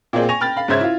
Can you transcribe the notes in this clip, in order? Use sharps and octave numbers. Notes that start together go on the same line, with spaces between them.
A#2 A#3 C4 G#4 D5 G5
G#5 C#6 A#6 F7
G5 B5 F6 A6
F5 B5
G#2 C#3 C#4 C5 E5 G#6
E4 F4